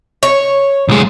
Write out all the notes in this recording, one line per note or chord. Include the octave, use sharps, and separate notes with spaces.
C#5
B1 G#3